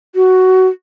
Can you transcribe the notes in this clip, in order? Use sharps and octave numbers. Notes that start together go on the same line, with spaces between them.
F#4